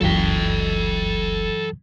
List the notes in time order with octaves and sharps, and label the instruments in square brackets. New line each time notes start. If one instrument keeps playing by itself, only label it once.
[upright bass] F#1 C#2 [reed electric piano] E3 F#3 [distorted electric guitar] A4 G5